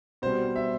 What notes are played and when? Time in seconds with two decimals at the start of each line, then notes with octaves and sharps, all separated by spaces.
0.22 B2 G3 C5
0.56 E5